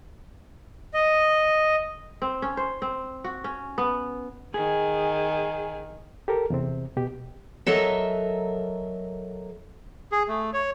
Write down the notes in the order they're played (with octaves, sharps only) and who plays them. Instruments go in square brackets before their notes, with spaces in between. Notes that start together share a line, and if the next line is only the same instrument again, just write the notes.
[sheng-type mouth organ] D#5
[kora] C4
C#4
C5
C4
F#4
C#4
B3
[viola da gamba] D#3 [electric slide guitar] G#4
[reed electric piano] G4 A4 A#4
E2 C3 C4
B2 G4
[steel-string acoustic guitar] F#3 A4 A#4 D#5 E5
[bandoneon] G#4
A3
C#5